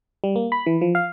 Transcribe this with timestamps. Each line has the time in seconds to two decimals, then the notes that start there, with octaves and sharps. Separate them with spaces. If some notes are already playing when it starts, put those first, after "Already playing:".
0.24 G3
0.36 A#3
0.52 B5
0.66 E3
0.81 F3
0.95 F5